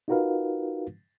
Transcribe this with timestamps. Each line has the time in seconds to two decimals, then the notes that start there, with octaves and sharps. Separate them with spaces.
0.08 D#4 F4 F#4 A#4 B4 F5